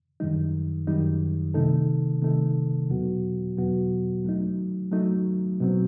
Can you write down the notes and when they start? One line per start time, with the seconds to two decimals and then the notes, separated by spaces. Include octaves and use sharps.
0.20 F#2 D#3 G3 D#4
0.87 F#2 D#3 G3 D#4
1.54 C3 D#3 A3 D#4 A4
2.22 C3 D#3 A3 D#4 A4
2.89 E2 B2 F#3 B3 F#4
3.57 E2 B2 F#3 B3 F#4
4.25 F#3 A3 D#4
4.92 F#3 A3 D#4
5.60 B2 F#3 C4